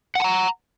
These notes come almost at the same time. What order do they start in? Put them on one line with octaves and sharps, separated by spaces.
F#5 A5 A#5